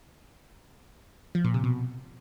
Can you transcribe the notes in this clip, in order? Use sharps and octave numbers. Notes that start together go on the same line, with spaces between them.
F3
A#2
C3
B2